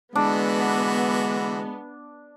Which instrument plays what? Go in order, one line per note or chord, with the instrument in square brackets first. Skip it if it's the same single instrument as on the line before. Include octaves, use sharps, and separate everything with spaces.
[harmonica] D3 E3 F#4 [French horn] G#3 [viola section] B3 [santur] D4